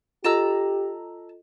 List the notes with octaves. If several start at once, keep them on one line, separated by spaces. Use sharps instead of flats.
F4 G4 A4 D#5 A5 A#5 E6